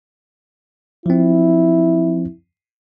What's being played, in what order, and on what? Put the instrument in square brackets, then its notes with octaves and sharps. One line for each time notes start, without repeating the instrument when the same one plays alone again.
[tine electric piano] F3 C4 [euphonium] E4